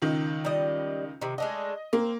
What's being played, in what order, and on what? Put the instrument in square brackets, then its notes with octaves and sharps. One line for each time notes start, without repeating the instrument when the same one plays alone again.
[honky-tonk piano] C#2 D#3
[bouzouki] G3 D#5
C3 D#3
[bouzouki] G#3 A3 D4 [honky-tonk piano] D#5
[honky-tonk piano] A#3 [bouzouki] C4